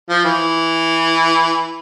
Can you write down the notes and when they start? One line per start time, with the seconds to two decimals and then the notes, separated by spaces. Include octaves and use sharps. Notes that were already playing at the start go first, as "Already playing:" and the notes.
0.09 F3
0.25 E3